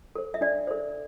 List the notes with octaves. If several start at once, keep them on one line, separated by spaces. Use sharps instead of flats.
A4 C5
E5
D4 D5
A4 C5